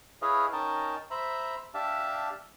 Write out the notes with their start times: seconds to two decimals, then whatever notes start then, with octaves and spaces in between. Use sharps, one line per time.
0.22 E4 G#4 B4 C#5 D#5 F5
0.53 C#4 D#4 A#4 G5 A5
1.11 C5 E5 A#5 B5
1.74 D4 G4 E5 F5 A5